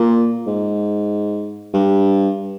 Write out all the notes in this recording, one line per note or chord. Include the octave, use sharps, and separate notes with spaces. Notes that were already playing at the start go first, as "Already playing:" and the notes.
Already playing: A#2
G#2
G2